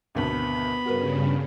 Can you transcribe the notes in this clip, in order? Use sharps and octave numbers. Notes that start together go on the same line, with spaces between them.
G#1 D2 B2 B3 B5
G2 C#3 F#4 A#4 B4